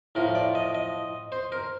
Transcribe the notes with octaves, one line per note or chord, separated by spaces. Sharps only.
A2 F3 A#4
D5
D#5
D#5
C5
A#4